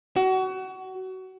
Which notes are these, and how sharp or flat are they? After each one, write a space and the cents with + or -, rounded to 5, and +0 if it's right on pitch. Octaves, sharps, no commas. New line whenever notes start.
F#4 +25